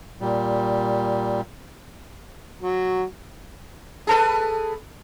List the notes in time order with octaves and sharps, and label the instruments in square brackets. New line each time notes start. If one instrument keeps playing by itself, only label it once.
[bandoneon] A#2 G3
[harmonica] F#3
[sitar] G#4 A4 B4